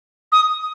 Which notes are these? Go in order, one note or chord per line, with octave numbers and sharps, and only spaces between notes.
D#6